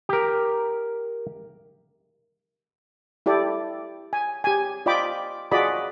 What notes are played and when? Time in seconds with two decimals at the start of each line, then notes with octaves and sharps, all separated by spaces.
0.09 G4 A#4
3.26 E4 G4 A4 D5
4.13 G#5
4.44 G4 G#5
4.86 F4 D5 D#5 G5 B5 D6
5.51 F4 F#4 G#4 D5 D#5 B5